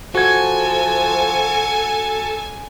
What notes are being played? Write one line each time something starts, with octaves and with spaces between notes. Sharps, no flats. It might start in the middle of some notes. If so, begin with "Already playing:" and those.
F3 F#4 A4 G#5 G#6